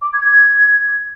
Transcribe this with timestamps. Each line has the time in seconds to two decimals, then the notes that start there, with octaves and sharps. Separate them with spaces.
0.02 D6
0.13 G#6
0.25 G#6